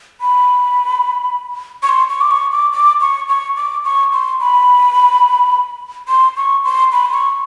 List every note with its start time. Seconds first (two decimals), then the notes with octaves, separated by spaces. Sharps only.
0.21 B5
1.83 C#6
1.89 C6
2.10 C#6
2.21 D6
2.31 C#6
2.52 D6
2.73 D6
3.01 C#6
3.29 C#6
3.57 D6
3.85 C#6
4.13 C6
4.40 B5
6.09 C6
6.37 C#6
6.64 C6
6.92 B5
7.06 C6
7.13 C#6